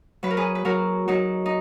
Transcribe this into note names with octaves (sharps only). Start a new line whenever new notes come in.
F#3 B4
A#4
G#4 B4
B4
F#3 F#4 A#4
F#3 D#4 F#4
D#4